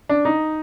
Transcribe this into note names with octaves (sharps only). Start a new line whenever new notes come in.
D4
D#4